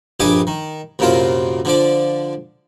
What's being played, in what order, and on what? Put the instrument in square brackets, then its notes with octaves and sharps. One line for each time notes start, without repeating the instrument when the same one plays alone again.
[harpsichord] A#1 G2 G4 D#5 G#5 D6
D#3
C2 F#2 A#2 A#3 F4 C5
D3 F3 D5